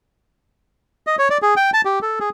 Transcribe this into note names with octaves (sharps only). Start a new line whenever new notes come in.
D#5
C#5
D5
G#4
G5
A5
G4
A4
G#4